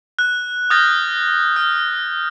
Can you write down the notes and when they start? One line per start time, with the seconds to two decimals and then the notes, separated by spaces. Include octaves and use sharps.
0.19 F#6
0.70 D#6 F6 G6 A6 A#6
1.56 F6